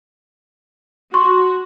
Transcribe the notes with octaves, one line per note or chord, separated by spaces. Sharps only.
F#4 C6 C#6